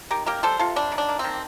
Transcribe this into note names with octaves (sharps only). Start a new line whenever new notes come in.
D#3 G4 A#4
A#3 G4 A#4
G3 A4 C5
C3 F4 A4
G3 D4
D#3
D4
A#3
D#3 C4